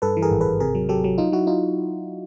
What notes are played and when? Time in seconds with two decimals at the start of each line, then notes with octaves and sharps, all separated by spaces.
0.02 G2 A4 B4
0.17 E3
0.22 G#4 A#4
0.31 G#1
0.41 A4 B4
0.46 G#1
0.60 C3 G#4 A#4
0.75 F#3
0.89 F#3 G4 A4
1.04 F#3
1.18 F#3 D#4 F4
1.32 F#3 E4 F#4
1.47 D#4 F4